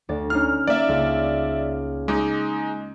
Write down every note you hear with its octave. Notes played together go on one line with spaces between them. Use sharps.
D2 D5
C#4 D#4 F6 C7
A#3 D5 E5
C#2
G#3 D#4 D6